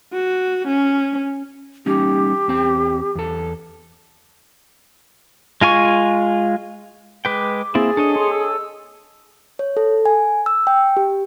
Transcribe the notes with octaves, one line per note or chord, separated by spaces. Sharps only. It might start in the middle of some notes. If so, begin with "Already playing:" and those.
F#4
C#4
G3 C#4 D#4 G4
E2 C4 G5
E2 A4
G#3 F4 G#5 C#6
G#3 B4 G5 D6
A#3 C4 E4 G#4 A6
D4 A4 C#5 D#5
C6
E6
C#5
A4
G#5
E6
G5
G4